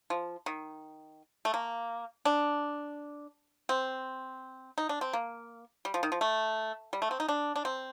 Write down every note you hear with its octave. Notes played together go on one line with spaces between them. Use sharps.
F3
D#3
A3
A#3
D4
C4
D#4
D4
C4
A#3
G3
F3
D#3
F3
A3
G3
A3
C4
D#4
D4
D4
C4